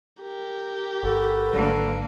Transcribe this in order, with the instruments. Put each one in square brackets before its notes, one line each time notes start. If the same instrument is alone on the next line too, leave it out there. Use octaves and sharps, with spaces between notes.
[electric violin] G4 A#4
[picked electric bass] G1 G2 [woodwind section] F#4 A4 B4
[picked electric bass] G#1 G#2 F#3 [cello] D3 A#3